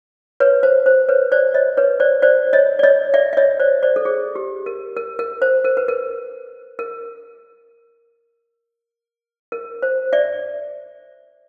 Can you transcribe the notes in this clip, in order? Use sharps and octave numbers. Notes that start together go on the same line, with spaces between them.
B4 C#5
C5
C5
B4 C#5
C5 D5
C#5 D#5
B4 C#5
C5 D5
C5 D5
C#5 D#5
D5
C#5 D#5
D5 E5
E5
C#5 D#5
C5 D5
C5 D5
A4
G#4
G4
A#4
A#4
A#4
C5
A#4
B4
A#4
A#4
A#4
C5
D5 E5